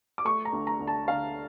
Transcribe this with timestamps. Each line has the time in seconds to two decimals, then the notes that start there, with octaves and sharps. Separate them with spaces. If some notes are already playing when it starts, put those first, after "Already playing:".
0.18 D6
0.25 A3 C#6
0.45 A#5
0.53 D2
0.67 A#5
0.80 D2
0.87 A5
1.08 D3 F5